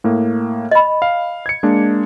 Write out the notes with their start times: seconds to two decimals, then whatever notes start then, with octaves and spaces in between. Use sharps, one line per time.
0.04 A2 A#3
0.71 D#5 B5
1.02 F5
1.46 G#6 C#7
1.63 G#3 A#3 D4